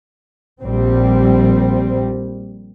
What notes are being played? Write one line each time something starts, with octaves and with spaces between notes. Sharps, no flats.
A#1 G3 C4